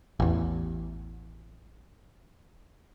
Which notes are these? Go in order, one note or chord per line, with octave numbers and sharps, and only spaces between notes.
A1 E2